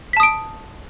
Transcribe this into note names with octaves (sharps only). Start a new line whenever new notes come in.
A5 D#6 B6 D7